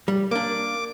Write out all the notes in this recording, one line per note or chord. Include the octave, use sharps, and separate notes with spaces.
G3
A#3 D4 D6